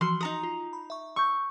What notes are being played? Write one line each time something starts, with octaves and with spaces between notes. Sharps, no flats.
E3 F3 F#4 C6
D#4 F#4 A#5 C6 D#6
F4
B5
E5 C#6
C#6 E6 G6